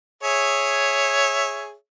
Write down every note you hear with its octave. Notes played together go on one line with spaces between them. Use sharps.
G#4 C#5 E5